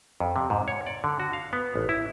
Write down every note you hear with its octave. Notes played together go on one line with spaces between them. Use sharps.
F2
C3
G#2
C#5
D5
D3
F#4
F5
B3
A1
E4